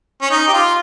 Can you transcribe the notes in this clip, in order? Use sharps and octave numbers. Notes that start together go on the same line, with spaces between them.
C#4
D#4
G4
F4